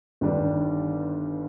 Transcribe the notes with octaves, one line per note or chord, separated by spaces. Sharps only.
G1 G2 D#3 G3 D4